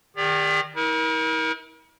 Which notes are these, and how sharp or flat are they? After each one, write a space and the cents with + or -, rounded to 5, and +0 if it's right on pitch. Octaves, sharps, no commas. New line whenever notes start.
D#3 -10 G4 +45 D5 +0
E4 -45 A#4 +25